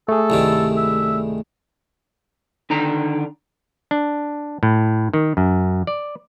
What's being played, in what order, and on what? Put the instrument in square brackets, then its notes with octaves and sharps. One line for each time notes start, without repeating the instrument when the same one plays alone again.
[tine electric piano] A3 G#4 [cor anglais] A4
[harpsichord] C2 G2 D#3
[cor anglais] E5
[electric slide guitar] D3 D#3 D4 A#5
[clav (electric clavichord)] D4
A2
D#3
F#2
D5